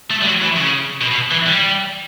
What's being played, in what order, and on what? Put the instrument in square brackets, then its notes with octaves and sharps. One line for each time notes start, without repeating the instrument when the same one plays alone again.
[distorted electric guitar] A3
G3
F#3
E3
C#3
B2
B2
E3
G3